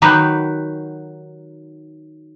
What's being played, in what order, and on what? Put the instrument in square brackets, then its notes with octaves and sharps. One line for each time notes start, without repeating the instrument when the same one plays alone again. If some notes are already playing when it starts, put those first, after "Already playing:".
[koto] D#3 F#3 D#4 F#4 G4 B4